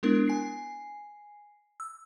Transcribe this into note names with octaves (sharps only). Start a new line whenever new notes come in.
G#3 B3 D4 E4 A#4
G#5 C7
E6